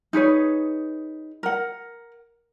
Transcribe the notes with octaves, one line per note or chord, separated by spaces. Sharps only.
D#4 G#4 B4 C#5
A#4 F#5